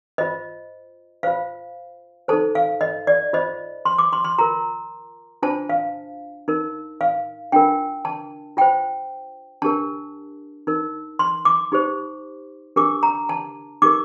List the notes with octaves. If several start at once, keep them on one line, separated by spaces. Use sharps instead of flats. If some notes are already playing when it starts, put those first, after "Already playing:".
F4 C5 D#5
F4 C5 F5
D#4 A4 C5 A5
F5
D#5
D5
F4 C5 D#5
C6
D6
C6
C6
F4 A#4 A#5
D4 F4 C5 A5
F5
D#4 A#4
F5
D4 F4 A#4 G5
A5
F4 C5 G5
D4 G4 A#4 A5
D#4 A#4
C6
D6
D#4 G4 C5
D4 G4 A#4 D6
A#5
A5
D#4 G4 A#4 D6